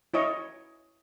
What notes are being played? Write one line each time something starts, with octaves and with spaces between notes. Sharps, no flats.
E4 C#5 D#5